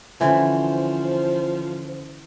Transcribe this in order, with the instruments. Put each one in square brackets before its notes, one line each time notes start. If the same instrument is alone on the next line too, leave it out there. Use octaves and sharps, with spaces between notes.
[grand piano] D3 C#4 [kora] E3 [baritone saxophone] F3 [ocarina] C5